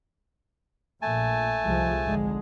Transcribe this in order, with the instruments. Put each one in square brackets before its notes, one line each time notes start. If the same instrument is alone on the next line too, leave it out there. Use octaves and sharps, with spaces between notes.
[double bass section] A#1 A#2 [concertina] A3 G#5 A5
[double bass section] C2 F3 G#3
G#1 D3 G#3